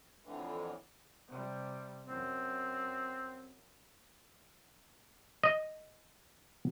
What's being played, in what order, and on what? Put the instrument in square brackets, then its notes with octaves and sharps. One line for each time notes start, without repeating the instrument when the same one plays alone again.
[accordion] F2 A2 D3 E3
[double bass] C3 G3
[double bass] F#2 [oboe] C4
[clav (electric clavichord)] D#5